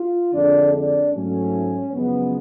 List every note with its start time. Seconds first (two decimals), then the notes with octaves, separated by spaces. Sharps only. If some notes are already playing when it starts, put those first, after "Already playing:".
Already playing: F4
0.34 F2 D3 G#3 D4
0.74 D4
1.14 G#2 F#3 A3 C#4
1.94 F#2 C#3 F3 G#3 B3